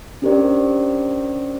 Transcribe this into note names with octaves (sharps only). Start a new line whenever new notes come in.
C#4 D4 G4 A#4 C5 D5